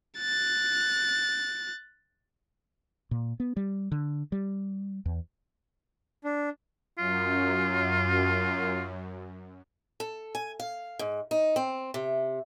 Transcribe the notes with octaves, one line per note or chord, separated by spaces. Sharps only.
F#6 A6
A#2
B3
G3
D3
G3
E2
D4
F#2 F4
A4
G#5
F5
G#2
D#4
C4
C3